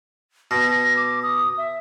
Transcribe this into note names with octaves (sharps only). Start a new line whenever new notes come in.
B2 A#6
D6
D#6
E5